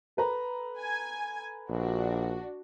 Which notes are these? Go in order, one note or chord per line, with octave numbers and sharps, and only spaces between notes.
A4 B4 A#5
G#5 G#6
A#1 D4 F#4